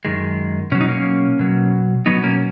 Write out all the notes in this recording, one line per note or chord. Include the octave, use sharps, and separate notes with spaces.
F#2 D#3 G#3
B2 F#3 C#4
D#4
A#3 C#4
B2 F#3
B2 F#3 B3 D#4
A#3 C#4